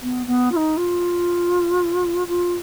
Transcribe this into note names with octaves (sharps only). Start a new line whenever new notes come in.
B3
B3
F4
D#4
F4
F4